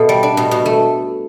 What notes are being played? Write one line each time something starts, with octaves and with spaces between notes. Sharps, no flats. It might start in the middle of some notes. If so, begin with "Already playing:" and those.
Already playing: B2 A3
G3
D4
B2
B2
A3